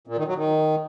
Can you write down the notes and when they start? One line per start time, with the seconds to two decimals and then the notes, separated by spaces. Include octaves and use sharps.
0.07 A#2
0.17 D#3
0.27 F#3
0.37 D#3